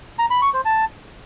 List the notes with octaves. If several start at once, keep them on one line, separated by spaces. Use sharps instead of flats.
A#5
B5
C#6
C5
A5